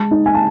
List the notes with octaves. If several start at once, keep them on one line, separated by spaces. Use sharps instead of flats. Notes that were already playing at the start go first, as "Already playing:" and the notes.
Already playing: G#3 A5
D#4
G#5
A5